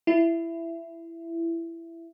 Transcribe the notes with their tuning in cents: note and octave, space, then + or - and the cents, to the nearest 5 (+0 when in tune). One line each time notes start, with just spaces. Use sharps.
E4 +15